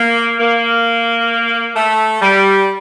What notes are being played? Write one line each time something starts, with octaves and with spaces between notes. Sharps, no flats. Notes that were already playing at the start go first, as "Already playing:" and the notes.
Already playing: A#3
A#3
A3
G3